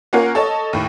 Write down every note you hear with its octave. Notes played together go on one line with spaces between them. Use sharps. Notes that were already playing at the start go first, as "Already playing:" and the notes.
A#3 C#4 F4 A#4 F5 F#5
A4 C#5 D#5 A5
D#2 A2